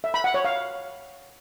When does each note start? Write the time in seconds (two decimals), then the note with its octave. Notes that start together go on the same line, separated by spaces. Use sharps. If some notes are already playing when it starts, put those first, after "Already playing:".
0.04 E5
0.14 B5
0.24 F#5
0.34 C#5
0.45 F5